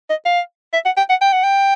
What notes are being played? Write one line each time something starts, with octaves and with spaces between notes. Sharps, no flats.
D#5
F5
E5
F#5
G5
F#5
G5
F#5
G5